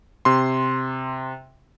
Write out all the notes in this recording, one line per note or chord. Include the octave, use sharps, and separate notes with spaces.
C3 C6